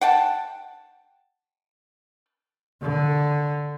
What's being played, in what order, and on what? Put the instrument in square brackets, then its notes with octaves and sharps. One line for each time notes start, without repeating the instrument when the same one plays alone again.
[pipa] F#5 G5 A5
[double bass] D3